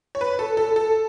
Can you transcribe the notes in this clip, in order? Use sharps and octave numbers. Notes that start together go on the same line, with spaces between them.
C#5
B4
A4
A4
A4